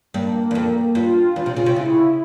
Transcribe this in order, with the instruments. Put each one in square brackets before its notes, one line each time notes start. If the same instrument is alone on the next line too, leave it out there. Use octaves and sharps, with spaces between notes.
[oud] G2 [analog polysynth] A#3
[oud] E2
F2
[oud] G2 [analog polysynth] F4
[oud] E2
C3
C#3
C3
[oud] C#3 [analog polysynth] E4